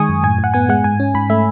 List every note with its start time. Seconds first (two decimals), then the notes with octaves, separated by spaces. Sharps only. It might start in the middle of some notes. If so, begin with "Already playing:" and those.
Already playing: D#3 G#3 G#5 C#6 D#6
0.09 F#2
0.23 A2 G#5
0.38 A2
0.44 F#5
0.54 B3 G#5
0.69 G#3 F#5
0.84 G#2 G#5
1.00 C#4
1.14 G#2 B5
1.30 A3 E5